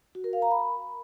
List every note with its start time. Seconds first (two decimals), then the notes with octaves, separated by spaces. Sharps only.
0.15 F#4
0.24 A#4
0.33 F5
0.42 A#5
0.51 B5